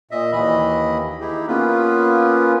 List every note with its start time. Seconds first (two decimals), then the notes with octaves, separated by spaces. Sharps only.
0.11 A#2 D#5 E5
0.32 D#2 E3 D#5 B5
1.21 D#4 E4 G4 G#4
1.48 A#3 B3 C#4 F4 B4